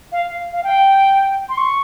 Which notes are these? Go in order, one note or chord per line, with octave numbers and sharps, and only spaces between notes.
F5
F5
G5
C6
C#6